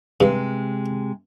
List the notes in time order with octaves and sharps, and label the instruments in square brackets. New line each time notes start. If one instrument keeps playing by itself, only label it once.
[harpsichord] G2 [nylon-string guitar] C3 G#3